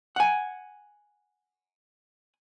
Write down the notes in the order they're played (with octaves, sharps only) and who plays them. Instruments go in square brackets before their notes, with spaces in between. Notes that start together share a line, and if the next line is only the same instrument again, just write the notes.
[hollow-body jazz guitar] F#5 G#5